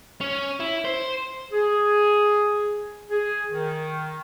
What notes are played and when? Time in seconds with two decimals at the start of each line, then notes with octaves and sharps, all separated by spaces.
0.21 C#4
0.60 E4
0.85 C5
1.52 G#4
3.10 G#4
3.51 D#3